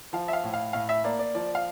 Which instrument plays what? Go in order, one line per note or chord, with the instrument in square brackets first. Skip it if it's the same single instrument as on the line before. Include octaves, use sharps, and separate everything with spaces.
[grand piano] F3 F5
E5
F5
A2
F5
A2 F5
E5
A#3 D5
D5
F3 D5
F5